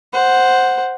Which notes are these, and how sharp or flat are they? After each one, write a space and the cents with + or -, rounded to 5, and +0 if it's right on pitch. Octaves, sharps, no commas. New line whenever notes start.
C5 +0 F#5 +0